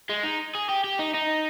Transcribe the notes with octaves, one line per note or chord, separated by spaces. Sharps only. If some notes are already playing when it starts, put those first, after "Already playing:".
G#3
D#4
G#4
G4
G4
D#4
D#4